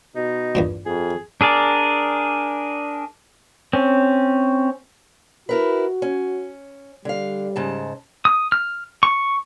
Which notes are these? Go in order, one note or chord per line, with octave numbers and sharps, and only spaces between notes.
B2 D#4
E2 G2 A#2
F2 G#4
D4 G#4 A#4 D5
C4 C#4
E4 F#4 A#4 B4
C#4
D3 G3 F5
G#2 C#3 A5
D#6
F6
C#6